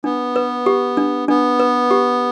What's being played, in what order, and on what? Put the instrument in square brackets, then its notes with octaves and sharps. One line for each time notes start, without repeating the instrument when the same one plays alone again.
[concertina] B3 [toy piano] D4
[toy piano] B4
G4
D4
[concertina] B3 [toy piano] D4
[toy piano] B4
G4